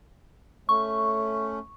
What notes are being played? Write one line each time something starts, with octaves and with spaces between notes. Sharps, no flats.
A3 C#4 C#6